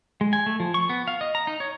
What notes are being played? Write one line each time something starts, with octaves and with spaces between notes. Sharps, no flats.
G#3
G#5
A3
F3
C#6
B3
F5
D#5
A#5
D#4
C#5